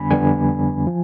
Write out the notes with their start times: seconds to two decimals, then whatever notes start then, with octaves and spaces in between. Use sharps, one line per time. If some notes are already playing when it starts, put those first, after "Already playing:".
Already playing: F2 D3 G3 B3 D4 G#5 B5
0.10 F2 D3 G3 B3 D4 G#5
0.87 F3